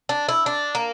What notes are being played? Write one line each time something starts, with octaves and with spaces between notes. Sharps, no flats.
D4
E4
D4
A#3